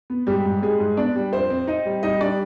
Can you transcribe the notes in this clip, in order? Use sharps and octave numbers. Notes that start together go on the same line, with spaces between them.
B3
G#2 G3 G4
G#2
G3 G#3 G#4
G#2
B3 D4 D5
G3
F2 C4 C5
C4
C4 D#4 D#5
G3
G3 D#4 D#5
G3 D4 D5